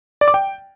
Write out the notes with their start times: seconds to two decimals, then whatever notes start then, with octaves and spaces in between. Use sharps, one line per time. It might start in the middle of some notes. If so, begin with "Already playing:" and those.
0.21 D5
0.28 D6
0.34 G5